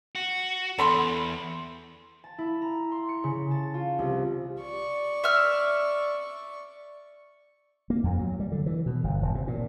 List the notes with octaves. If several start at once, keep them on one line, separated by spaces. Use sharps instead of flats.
F#4
E2 A4 B5 C6
A5
E4
A#5
C6
C#7
C#3
A5
F4
C2
D5 C#6
E5 F6
A#3
F2
F#3
G3
D3
E3
B2
G1
D#1
C3
A#2